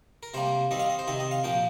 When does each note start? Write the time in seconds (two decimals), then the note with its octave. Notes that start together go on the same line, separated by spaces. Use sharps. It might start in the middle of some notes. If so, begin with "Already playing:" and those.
0.23 A#4
0.34 C3 G3 A#3 C5
0.71 D#3 G3 C4 D#5
0.79 F5
0.90 D#5
0.99 C5
1.08 C3 D#3 C4 D#5
1.20 D#5
1.31 F5
1.44 A#2 F3 A#3 G5